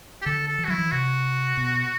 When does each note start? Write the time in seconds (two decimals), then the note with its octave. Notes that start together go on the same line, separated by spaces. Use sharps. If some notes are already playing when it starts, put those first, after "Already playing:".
0.22 G4
0.25 D3 A4
0.47 A4
0.58 E3
0.64 F#4
0.68 F#3 E4
0.78 E3
0.91 C3 F#4
1.57 B2